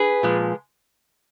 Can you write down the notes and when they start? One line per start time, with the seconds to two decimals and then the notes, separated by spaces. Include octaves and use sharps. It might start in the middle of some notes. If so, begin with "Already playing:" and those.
Already playing: G#4 B4
0.23 A#2 F3 G#3